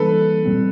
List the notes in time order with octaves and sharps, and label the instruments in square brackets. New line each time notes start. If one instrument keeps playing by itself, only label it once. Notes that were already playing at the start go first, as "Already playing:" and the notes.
Already playing: [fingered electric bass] E3 G3 A#3 D4 [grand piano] A4 B4
[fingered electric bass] A#2 G3 C4